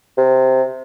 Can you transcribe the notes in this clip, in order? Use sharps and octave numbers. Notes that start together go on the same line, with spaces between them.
C3